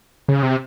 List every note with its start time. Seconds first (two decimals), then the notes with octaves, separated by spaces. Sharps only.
0.28 C#3
0.43 C3